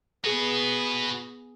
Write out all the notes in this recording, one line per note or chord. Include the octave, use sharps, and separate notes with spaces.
B3 F#4 G#4 B4